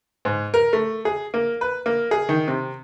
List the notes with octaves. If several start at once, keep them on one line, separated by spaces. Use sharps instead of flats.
G#2
A#4
A3
G#4
A#3
B4
A#3
G#4
D#3
C3